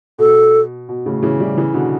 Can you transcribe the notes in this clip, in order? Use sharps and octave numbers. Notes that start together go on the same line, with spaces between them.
B2 A4
B2
A2 C#3
C#3 E3
E3 G3
C#3 E3
B2 D3